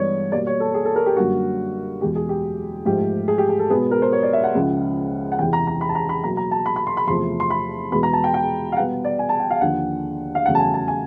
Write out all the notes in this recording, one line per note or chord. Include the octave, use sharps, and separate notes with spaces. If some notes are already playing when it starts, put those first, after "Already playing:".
Already playing: G2 E3 G#3 B3 C#5 D5
B2 G3 A#3 D5
C#5
A4
G#4
A4
A#4
G4
F#2 D3 G3 A#3 F#4
E2 B2 G#3 G4
G#4
G4
G#2 F3 A3 G4
G#4
G4
G#4
A4
B2 G#3 B3 G#4
A#4
C5
C#5
D5
E5
F#5
C#2 C#3 F3 G#3
F#5
E2 C3 E3 G5
A#5
A#5
B5
A5
A#5
B5
B2 F#3 A#3 A#5
A#5
A5
B5
B5
C6
B5
E2 C3 F3 A3 C6
C6
B5
E2 B2 G#3 B3 B5
A#5
A5
G5
G5
F5
B2 G3 B3 F#5
D5
G#5
A5
G5
F5
D#2 D3 F3 F#5
F5
E2 C#3 F#3 A3 F#5
A5
G#5
A5
G#5